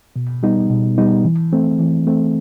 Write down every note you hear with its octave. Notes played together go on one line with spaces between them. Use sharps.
B2
G3 B3 D#4
B2
G3 B3 D#4
E3
A3 C4
E3
A3 C4